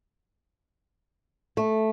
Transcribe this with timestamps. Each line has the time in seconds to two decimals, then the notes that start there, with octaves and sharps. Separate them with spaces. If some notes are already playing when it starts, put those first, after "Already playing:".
1.57 A3